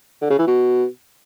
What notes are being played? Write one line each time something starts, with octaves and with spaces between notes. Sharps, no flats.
D3
C#3
E3
B2